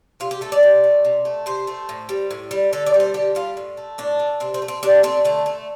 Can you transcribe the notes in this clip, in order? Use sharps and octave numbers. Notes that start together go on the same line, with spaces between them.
C3 F4
G4
A3 A4
D5
C3
A3
C3
A3
C3 C5
A3
A2
G3
A2
G3
D3 A4
D5
G3
C5
D3 G4
G3 F4
A2
A3
A2 D4
A3
C3 C4
C4
A3
C4
C3 D4
A3 C4
D3 A3
A3